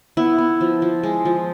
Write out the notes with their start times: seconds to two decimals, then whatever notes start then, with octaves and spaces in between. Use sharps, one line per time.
0.17 B3 E4
0.38 B3
0.61 F3
0.82 F3
1.03 G#3
1.25 F3